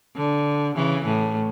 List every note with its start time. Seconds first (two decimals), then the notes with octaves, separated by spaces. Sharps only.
0.17 D3
0.76 C#3 E3
1.06 A2